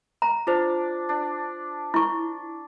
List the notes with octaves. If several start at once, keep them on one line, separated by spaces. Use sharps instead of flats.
A#5
D4 F4 C5
D4
E4 C#6